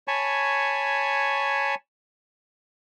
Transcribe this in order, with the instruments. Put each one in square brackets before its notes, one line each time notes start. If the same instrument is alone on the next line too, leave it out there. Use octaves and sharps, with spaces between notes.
[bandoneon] C#5 G#5 A5 B5 C#6